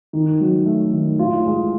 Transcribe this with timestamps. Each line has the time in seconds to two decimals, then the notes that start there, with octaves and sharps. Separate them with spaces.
0.13 D#3
0.41 F#3
0.66 A3
0.92 D#3
1.19 A2 F4
1.45 G#3